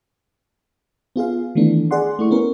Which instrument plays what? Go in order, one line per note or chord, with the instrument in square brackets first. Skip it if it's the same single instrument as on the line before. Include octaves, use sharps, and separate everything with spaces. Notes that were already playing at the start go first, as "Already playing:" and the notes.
[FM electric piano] B3 F4 G#4 F5
D#3 E3 A3 B3 D4
G#4 D5 F#5 C6
A3 E4 C#6
B3 C#4 A#4